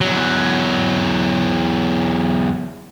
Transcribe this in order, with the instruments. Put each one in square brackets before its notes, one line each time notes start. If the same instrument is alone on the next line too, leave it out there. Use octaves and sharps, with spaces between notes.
[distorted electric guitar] E2 F#3